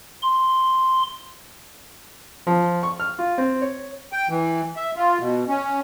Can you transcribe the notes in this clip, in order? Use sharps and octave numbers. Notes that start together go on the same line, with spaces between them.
C6
F3
C#6
F6
F4
C4
C#5
G5
E3
E5
F4
B2
C#4